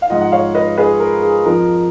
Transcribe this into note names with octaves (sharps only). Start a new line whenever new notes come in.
F5
G#2 F3 D#5 F#5
F#5
C#5 F5
B4 D#5
G#4 B4
A#4
G#4
F2 F3 A#4